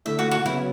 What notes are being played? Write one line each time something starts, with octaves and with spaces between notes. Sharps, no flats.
D3 A3 E4 E5
F#4
F#4
C#3 F#3 B3 E4